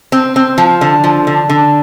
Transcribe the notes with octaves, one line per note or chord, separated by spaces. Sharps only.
C4
C4
F3
D3
F3
D3
D3